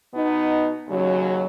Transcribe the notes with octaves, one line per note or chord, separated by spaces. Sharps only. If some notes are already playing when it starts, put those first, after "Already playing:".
B2 B3 D#4
D#2 C#3 F#3 C#4